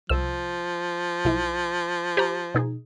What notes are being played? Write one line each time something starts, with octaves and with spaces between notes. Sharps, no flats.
C2 F3 E6
B1 E4
G4 C5 A#5
B2 D#4 G#4